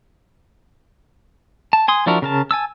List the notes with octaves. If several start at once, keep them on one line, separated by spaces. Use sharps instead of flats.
A5
G#5 C6 D#6
F3 D4 E4 F#4 A#4
C#3 A#4 A5
G#5 A5 E6